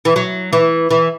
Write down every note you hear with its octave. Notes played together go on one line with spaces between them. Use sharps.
E3
F#3
E3
E3